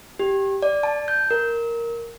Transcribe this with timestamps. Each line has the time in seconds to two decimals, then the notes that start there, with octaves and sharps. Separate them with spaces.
0.19 G4
0.62 D5
0.83 A5
1.08 G6
1.31 A#4